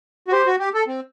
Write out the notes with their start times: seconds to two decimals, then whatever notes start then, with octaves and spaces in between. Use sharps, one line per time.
0.28 F#4
0.32 G4 C5
0.46 F#4
0.59 G4
0.74 A4
0.87 C4